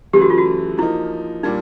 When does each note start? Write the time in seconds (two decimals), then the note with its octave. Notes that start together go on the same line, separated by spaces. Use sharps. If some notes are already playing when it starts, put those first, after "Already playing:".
0.13 F#2 C#3 E3 A3 G4
0.22 F#4
0.30 F4
0.38 F#4
0.78 F3 A#3 D#4 E4
1.43 A#2 G3 A#3 D4 D#4